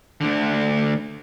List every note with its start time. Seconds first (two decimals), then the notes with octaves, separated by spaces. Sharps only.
0.21 D2 D3